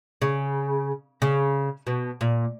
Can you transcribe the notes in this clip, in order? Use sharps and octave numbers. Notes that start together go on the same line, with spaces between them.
C#3
C#3
B2
A#2